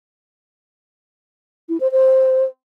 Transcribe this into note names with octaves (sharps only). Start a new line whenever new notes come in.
E4
C5
C5